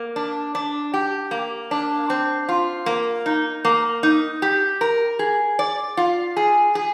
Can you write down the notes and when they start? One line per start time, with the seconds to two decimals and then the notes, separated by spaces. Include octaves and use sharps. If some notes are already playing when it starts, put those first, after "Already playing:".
Already playing: A#3
0.16 D4
0.55 D4
0.94 G4
1.31 A#3
1.71 D4
2.10 C4
2.49 F4
2.86 A#3
3.26 D#4
3.65 A#3
4.03 D#4
4.42 G4
4.81 A#4
5.19 G#4
5.59 D5
5.97 F4
6.37 G#4
6.75 G#4